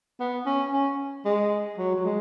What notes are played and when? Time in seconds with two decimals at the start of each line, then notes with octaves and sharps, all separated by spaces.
0.20 B3
0.46 C#4
0.73 C#4
1.25 G#3
1.78 F#3
1.95 F#3
2.05 G#3